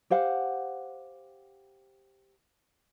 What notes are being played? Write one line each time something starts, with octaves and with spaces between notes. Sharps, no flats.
G4 C5 F5 F#5